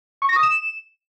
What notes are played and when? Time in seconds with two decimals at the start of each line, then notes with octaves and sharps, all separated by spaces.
0.22 C#6
0.29 A#6
0.36 D#6
0.43 E7